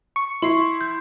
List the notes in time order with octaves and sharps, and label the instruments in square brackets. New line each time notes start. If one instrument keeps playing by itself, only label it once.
[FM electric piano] C#6
[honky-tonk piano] E4 [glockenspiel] C6 C7
[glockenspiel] G6